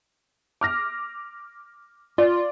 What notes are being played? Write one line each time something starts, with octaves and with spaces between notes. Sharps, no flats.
D6 F6 A#6
F4 D5